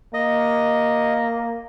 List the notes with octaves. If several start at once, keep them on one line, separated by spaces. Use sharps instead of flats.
A#3 D#5